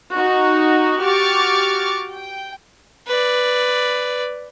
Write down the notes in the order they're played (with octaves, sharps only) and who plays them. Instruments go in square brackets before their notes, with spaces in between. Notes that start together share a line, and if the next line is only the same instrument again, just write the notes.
[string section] D#4 F#4
F#4 G4 C#6 D6 F6 A6
G5
[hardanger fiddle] B4 D5